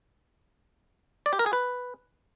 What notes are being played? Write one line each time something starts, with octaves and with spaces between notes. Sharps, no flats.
D5
G4
A#4
G#4
B4